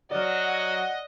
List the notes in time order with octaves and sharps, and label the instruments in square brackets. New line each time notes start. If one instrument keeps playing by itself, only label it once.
[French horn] F#3 [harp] D5 F6 [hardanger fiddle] D#5 [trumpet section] F#5